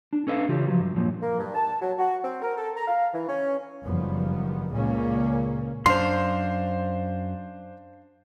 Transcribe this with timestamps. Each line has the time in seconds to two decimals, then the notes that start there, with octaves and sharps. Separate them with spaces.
0.13 D4
0.27 C#4 A4 B4 E5 F5
0.49 C#3 E3 F4 G4
0.67 F3 F#3
0.79 G2
0.96 F#2 A#2 F3
1.22 A#3
1.39 G2
1.54 A5
1.81 F#3
1.99 F#4
2.23 C4
2.42 A#4
2.57 A4
2.76 A#5
2.88 F5
3.13 E3
3.28 C#4
3.84 F#1 G2 D#3 F3 B3
4.72 C#2 A#2 C#3 G#3 A#3 C#4
5.86 F#2 D4 C5 F5 C6